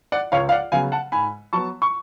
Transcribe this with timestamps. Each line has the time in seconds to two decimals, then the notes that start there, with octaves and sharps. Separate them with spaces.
0.12 D5 F#5
0.32 C#2 C#5 F5
0.49 F5
0.52 D5 F#5
0.72 C#3 F#3 B3 F5 G#5
0.92 F#5 A5
1.12 G#2 G#5 B5
1.53 F#3 B3 A5 C#6
1.82 C#6